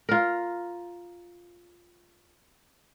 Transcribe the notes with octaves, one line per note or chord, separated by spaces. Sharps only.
F4 A#4